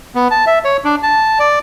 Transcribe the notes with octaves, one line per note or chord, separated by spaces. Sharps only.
B3
A5
E5
C#5
D4
A5
D5